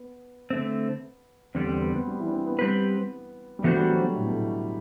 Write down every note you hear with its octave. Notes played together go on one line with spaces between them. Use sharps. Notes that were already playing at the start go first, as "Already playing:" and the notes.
Already playing: B3
D3 A3 C4
E2 D3 G3 C4
C4
B3
B3
G3
E3
D4
C4
B3
G3 C4 G4 B4
G3
E3 A3 B3 D4 F#4 C5
G3
F#3
D3
A2
B2
A2